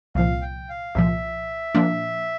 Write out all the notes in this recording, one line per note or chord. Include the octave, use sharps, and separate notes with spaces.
C2 A#2 F3 F5
G5
F5
C2 A#2 F3 E5
A#2 F3 A#3 D4